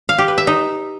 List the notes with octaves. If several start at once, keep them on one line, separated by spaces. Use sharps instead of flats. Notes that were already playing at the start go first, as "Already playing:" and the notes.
F5
G4
B4
E5
D#4